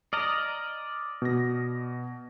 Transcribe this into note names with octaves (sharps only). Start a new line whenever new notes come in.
D5 D#5 A#5 F6
B2 A#6